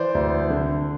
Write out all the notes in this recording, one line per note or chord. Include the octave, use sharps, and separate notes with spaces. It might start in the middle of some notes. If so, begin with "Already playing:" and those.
Already playing: E3 C5 D5
D2
D3